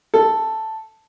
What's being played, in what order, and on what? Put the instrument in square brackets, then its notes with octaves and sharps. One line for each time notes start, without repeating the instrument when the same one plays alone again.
[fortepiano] A4